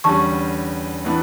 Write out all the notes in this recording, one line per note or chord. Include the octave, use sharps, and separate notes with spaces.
E2 D3 G3 C#4 A5 C#6
A2 E3 B3 D4